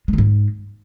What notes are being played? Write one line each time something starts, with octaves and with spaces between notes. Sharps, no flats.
G#3
D#3
G#2